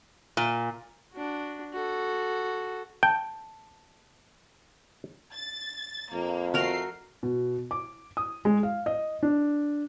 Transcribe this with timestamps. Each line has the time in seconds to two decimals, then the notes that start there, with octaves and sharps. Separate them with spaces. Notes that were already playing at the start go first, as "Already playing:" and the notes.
0.37 A#2
1.13 D4 F#4
1.74 F#4 A4
3.03 G5 A5
5.34 A6
6.13 F2 A#3
6.54 A3 F#4 A#4 A#5 C7
7.23 B2
7.71 D6
8.17 D#6
8.45 G#3
8.63 F5
8.86 D#5
9.23 D4